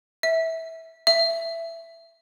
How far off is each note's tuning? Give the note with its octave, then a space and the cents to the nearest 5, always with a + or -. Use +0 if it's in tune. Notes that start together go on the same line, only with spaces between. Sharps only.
E5 -15
E5 +15